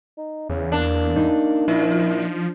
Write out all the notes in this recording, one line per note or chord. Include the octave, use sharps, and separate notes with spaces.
D#4
E2 C#3
A#3 D4
D#4
A#2 F3 E4